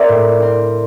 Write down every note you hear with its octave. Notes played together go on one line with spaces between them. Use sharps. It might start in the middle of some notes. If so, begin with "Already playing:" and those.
Already playing: C4 A#4 C5 D5 E5
A2
C4